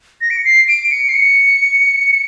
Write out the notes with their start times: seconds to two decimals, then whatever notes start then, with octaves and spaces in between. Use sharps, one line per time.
0.21 A#6
0.30 D7
0.37 C#7
0.44 C7
0.68 D7
0.91 C#7
1.09 C7
1.14 C#7